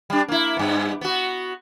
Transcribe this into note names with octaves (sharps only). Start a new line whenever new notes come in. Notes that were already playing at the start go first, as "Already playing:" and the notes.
G3 D4
A#3 E4
G2 B3
B3 F#4